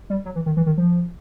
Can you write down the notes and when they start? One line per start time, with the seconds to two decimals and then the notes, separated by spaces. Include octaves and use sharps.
0.10 G3
0.25 F#3
0.35 E3
0.46 D#3
0.57 E3
0.66 D#3
0.78 F3